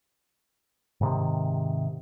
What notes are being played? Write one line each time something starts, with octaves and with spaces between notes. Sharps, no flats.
G#2 C3 D#3